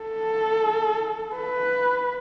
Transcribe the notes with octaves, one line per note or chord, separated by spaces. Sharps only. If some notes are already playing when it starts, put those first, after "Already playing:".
Already playing: A4
B4